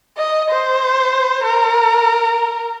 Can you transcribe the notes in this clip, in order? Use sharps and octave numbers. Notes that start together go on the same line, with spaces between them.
D#5
C5
A#4